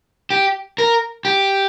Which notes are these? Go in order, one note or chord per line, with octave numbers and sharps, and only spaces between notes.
G4
A#4
G4